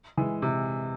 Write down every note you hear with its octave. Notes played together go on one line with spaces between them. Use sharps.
E3 G#3
C3